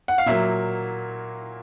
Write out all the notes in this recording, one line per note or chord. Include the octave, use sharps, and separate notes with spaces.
F#5
F5
A#2 F#3 A#3 E5